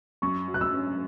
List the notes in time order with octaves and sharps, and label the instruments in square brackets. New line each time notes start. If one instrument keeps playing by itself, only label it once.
[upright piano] F#2 [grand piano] C#6
[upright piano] F#3
[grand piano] F#6
E6
[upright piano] C#4